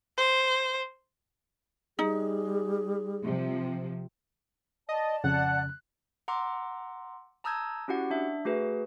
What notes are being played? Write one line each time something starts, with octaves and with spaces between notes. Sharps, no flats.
C5
G3 D#4 G#4
C3 F3
D5 D#5 A5
F2 C#3 F#5 F#6
F#5 A#5 C6 D6 E6
A5 A#5 D#6 E6 G6 G#6
C#4 E4 F#4 G4 F#5
D4 E5
A3 F#4 G#4 B4